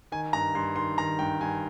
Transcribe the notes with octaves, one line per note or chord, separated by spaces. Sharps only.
D#3 G#5
G2 A#5
G2 C6
D#3 C6
D#3 A#5
G2 G5
G2 G#5